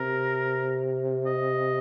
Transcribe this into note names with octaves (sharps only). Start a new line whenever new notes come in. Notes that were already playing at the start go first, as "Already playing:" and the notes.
Already playing: C3 A#4
D#5